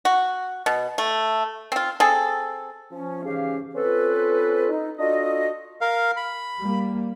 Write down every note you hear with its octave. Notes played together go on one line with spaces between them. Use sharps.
F#4
B2
A3
C4 F4
C4 G#4 A4
F3 C#4
G#2 C#3 E3 C#4 G4 F5
C4 C#4 F4 A4 B4
D#4
D4 F4 F#4 A4 D#5
A#4 F5
B5
G3 A#3